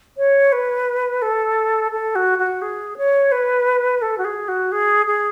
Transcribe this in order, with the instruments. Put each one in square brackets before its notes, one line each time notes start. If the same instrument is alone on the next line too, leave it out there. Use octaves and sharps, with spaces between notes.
[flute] C#5
B4
A4
A4
F#4
F#4
G#4
C#5
B4
A4
F#4
G#4
F#4
G#4
G#4